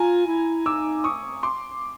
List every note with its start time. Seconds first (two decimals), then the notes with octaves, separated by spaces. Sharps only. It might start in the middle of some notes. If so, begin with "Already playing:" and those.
Already playing: F4 G#5 A#5
0.27 E4
0.66 D#4 D6 E6
1.04 C#6 D#6
1.43 C6 D6